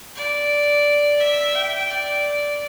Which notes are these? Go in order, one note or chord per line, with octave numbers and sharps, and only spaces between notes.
D5
E5
G5
D5